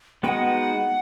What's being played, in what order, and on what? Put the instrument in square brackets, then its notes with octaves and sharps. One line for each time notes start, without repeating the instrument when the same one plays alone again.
[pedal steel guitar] G#3 B3 D#4 F#4 B4 [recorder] F#5 G5